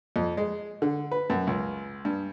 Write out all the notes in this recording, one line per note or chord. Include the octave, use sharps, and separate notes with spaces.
F2
G#3
D3
B4
F#2
C#2
G2